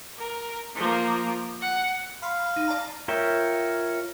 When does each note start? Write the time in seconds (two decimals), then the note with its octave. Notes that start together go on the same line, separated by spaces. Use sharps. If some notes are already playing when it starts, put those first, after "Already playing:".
0.18 A#4
0.75 F3 A#3
1.61 F#5
2.22 F5 B5 C6
2.56 D#4
2.68 D5 A5 A#5
3.08 F4 A#4 C#5 E5 G5